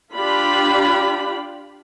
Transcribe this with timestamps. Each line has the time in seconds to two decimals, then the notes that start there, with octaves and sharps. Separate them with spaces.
0.14 D4 F4 G4 B5